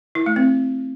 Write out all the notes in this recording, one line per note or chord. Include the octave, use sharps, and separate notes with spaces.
E4
A3
C4